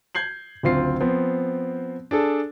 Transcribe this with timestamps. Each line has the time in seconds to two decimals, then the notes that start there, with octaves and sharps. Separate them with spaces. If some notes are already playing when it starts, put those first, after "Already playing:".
0.15 G6 G#6 C7 F#7
0.63 F#1 D2 C4 F4 C7
1.00 F3 B3 C4
2.11 D4 G#4 A4